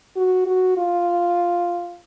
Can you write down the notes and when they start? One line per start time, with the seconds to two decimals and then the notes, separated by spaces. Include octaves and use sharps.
0.16 F#4
0.46 F#4
0.77 F4